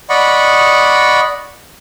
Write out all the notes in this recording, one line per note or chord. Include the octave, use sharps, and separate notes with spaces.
D5 D#5 F#5 B5 C#6